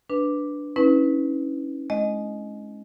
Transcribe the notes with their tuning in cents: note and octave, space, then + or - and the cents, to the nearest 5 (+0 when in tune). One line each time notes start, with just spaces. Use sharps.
D4 -5 B4 +0
C#4 -15 E4 -45 B4 +0
G#3 +30 D#5 -5